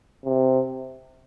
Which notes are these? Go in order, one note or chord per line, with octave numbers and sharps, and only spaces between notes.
C3